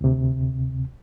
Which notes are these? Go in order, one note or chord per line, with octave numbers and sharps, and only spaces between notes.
D2 C3